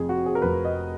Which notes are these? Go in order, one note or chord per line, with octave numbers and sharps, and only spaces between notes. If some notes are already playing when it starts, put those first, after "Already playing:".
Already playing: F1 F2 F3 G#4
F#4
G#4
A#4
F1 F2 F3 B4
D#5